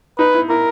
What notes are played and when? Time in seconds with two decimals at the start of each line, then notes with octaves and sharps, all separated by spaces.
0.19 D#4 B4
0.34 E4
0.49 E4 A#4